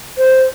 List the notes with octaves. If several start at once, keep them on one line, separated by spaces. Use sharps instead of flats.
C5